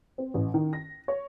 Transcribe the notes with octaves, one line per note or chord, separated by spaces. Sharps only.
C4
A1
D#3
A#6
C#5